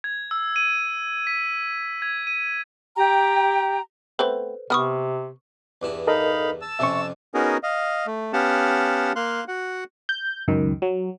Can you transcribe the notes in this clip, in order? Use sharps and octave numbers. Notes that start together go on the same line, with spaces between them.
G#6
E6
D#7
B6
G#6
D#7
G4 G5 A#5
A3 B3 C4 A4 B4 C5
C3 B3 B4 C#6 D#6 F6
E2 G2 E4
D#4 A4 A#4 D#5 F5 B5
A5 E6
F2 C3 C#4 E5 C#6
B3 C#4 D#4 F#4 G#4 A#4
D#5 F5
A3
B3 C#4 G4 F5 F#5 A5
A#3 F5 C6 F#6
F#4 F#5
G6
C#2 F#2 D#3
F#3